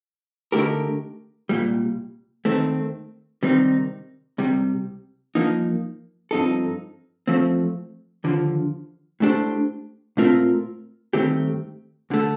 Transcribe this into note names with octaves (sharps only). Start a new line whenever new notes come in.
D3 A3 D#4 G4 A#4
C2 A#2 G3
D#2 D#3 A3 C4
C3 D#3 G3 C4 D#4
C2 C3 G3
G2 F3 A#3 D#4
G2 F3 C4 D#4 A4
F3 A3 C4
D#2 D3 F3
A2 A3 D4 G4 C5
A#2 A3 C4 F4 A#4
G2 D#3 A3 C4 G4
D2 D3 A3